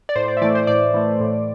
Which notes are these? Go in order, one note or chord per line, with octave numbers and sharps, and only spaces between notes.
D5
A2 C5
D5
E5
E3 A3 D5
C5
A2 D5
E3 A3
A2